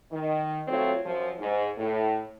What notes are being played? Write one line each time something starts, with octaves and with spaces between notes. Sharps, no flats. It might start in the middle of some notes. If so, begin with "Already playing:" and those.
D#3
F#3 A3 C4 F4 C#5
F#2 F3
G#2
A2